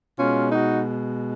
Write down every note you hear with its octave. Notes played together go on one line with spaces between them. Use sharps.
B2 G#3 C#4 F4
D#4 F#4